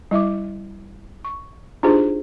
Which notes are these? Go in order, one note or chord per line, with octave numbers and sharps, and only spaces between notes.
G3 E4 E5 D6
C#6
D4 D#4 F4 G4 G#4 C5